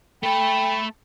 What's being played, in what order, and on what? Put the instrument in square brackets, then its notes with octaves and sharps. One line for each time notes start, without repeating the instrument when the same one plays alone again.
[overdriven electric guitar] A3 A4 [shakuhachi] G5 [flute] B5